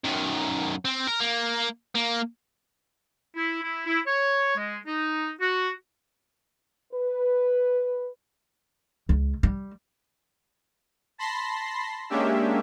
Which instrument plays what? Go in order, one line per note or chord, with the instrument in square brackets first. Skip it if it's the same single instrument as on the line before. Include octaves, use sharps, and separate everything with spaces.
[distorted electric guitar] F#2 D#3
C4
A#4
A#3
A#3
[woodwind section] E4
E4
E4
C#5
G#3
D#4
F#4
[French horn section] B4
[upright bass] C#2
G3
[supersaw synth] A5 B5 C6 A#6 C7
G#3 A#3 C#4 D4 G4 E5